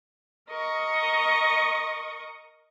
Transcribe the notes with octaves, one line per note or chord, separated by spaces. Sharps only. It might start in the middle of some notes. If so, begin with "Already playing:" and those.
A#4 D#5 C#6